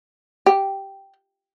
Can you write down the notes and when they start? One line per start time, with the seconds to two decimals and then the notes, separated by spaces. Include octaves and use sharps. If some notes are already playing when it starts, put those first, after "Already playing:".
0.46 G4